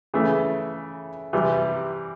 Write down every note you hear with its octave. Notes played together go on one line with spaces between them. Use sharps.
C#3 E3 A3
C3 E3 G3